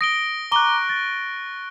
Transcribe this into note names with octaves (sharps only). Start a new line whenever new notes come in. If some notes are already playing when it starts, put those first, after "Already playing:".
D#6 A#6 D7 G7
A#5 C#6 D6 F#6 G7
A6